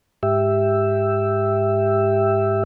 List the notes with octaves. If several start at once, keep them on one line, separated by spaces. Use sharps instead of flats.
G#2 G4 E5